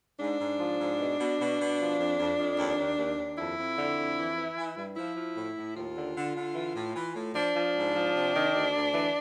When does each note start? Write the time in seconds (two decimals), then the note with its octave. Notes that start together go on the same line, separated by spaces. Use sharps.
0.19 G#2 D4
0.39 G#2
0.59 F3
0.79 G#2
0.99 B2
1.19 B2
1.39 B2
1.59 B2
1.78 F3
1.98 F2
2.18 F2
2.38 F2
2.58 D#2
2.77 D#2
2.97 D#2
3.17 D#2
3.37 F2 E4
3.57 F2
3.77 D3
3.97 F2
4.17 E3
4.36 E3
4.56 E3
4.76 G2
4.96 F3 E4
5.16 F3
5.36 A2
5.56 A2
5.75 D#2 F4
5.95 D3
6.15 D3
6.35 D3
6.55 E3
6.75 A2
6.94 E3
7.15 A2
7.34 F3 D4
7.54 F3
7.74 G#2
7.94 F3
8.14 C3
8.33 D#3
8.54 D2
8.74 D2
8.93 E3